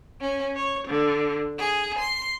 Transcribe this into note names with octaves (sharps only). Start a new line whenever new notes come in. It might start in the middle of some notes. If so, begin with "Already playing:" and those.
C#4
C#5
D3
G#4
C6